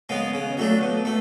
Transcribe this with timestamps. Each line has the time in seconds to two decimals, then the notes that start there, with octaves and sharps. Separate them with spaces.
0.09 C#3 G#3 B3
0.34 C#3
0.57 F#3 A3 D4
0.81 B2
1.05 A3